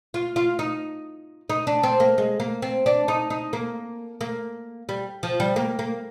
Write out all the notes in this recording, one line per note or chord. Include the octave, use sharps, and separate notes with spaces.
F4
F4
D#4
D#4
D4
C4
A#3
G#3
A#3
C4
D4
D#4
D#4
A#3
A#3
G3
F3
G3
A#3
A#3